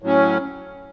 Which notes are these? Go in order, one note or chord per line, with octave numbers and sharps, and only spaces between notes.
A2 F#3 C#4